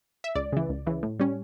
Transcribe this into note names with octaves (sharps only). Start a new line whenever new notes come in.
E5
C#2 D5
C#3 E3
C#2
C#3 E3
A2
G3 C#4